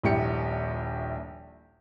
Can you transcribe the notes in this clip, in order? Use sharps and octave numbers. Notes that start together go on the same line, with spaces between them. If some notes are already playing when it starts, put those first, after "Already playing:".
D#1 A#1 E4 G4 C#7